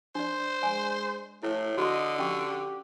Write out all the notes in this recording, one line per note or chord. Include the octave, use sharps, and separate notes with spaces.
D4 C5 D5
G#3 D5 G#5
A2 A3 E4
D3 F#4 D#5 B5 C6
C#4 G4 G5 C#6